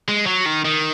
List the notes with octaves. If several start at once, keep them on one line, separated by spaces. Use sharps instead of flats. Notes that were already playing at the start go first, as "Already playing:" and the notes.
G#3
F#3
D#3
D#3